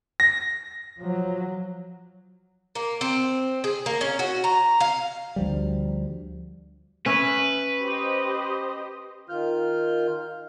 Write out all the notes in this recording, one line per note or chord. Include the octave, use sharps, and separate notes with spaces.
A#6
F3 F#3
A#3
C4
G#4
A#3
C#4
F#4
A#5
F5
D2 F3 G3
C#4 B4 E5
G4 C5 D#5
D#3 F4 F6 G6